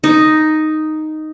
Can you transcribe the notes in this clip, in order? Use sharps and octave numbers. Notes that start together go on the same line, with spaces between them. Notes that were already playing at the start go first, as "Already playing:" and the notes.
D#4